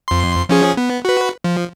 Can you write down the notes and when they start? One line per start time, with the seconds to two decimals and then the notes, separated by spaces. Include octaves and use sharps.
0.08 F2 C6
0.49 F3 C#4 G#4
0.77 B3
1.05 F#4 B4
1.44 F3